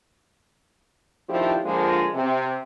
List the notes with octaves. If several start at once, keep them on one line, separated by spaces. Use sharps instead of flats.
D#3 F3 A3 D4 E4 G4
D3 F3 G#3 A#3 D4 F4
C3